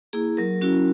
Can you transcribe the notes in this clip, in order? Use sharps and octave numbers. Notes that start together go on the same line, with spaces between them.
A#3 E4 G#4
F#3 A#4
C#4 E4 F#4